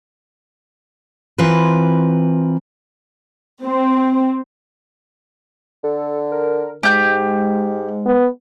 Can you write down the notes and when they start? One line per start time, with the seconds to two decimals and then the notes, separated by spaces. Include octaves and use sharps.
1.38 E3 C4 F4 A#4 B4
3.64 C4
5.84 D3 A4
6.32 A#4
6.83 G#2 G#3 G4 G6
8.06 B3